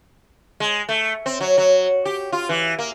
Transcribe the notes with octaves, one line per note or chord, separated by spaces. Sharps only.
G#3
A3
C4
F#3
F#3
G4
F4
E3
A#3